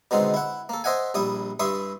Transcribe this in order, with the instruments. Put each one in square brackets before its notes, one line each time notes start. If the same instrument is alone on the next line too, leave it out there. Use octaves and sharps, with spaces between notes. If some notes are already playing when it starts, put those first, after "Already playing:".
[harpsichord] B2 D3 D#3 G#3 C4
E4 F#5
A#3 A4
C5 D#5 E5 F#5 G#5
A#1 G3 E4 D#6
G2 E4 E5 C6 C#6 D#6